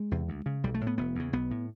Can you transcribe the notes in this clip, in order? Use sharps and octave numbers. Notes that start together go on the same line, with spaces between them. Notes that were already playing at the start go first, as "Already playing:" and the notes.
Already playing: G#3
E2 C3
D2
C#3
B1 G3
A3
A2
B3
F1 B3
E2 C#3
B1 B3
A2